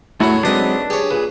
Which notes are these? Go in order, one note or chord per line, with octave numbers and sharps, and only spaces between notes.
E2 A2 F#3 A3 E4 F#4
B1 F#3 G#3 C4 D4 B4 D#5
G4 G#4 C#5
A#2 G#4 B4